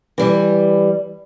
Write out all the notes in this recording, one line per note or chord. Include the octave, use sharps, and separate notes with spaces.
E3 G3